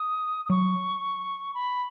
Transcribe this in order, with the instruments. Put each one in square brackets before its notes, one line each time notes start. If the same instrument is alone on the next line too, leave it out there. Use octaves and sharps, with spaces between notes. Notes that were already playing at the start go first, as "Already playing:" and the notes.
Already playing: [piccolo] D#6
D#6
[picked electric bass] F#3 [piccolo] C#6
[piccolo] B5